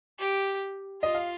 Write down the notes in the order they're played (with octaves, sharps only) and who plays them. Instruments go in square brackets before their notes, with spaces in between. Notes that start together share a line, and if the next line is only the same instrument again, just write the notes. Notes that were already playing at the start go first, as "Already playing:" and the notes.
[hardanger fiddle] G4
[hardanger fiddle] F4 [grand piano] D#5
[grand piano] F5